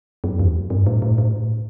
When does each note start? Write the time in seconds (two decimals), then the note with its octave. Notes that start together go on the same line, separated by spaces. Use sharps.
0.24 F#2
0.40 E2
0.70 G2
0.87 A2
1.02 A2
1.18 A2